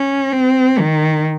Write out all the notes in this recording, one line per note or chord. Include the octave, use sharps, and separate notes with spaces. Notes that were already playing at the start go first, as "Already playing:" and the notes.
Already playing: C#4
C4
D#3